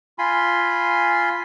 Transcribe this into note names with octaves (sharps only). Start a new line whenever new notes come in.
F4 G#5 B5 C6